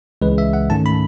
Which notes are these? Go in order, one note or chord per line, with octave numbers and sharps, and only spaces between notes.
C#2 C#3 E3 G#3 B4
E5
F#5
G#2 D#3 A3 C#4 A5
B5